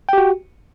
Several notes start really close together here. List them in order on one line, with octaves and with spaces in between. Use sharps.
G5 G4 F#4